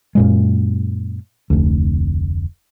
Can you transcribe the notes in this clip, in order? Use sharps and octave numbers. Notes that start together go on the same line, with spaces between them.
F#2 A#2 G#3
F1 D2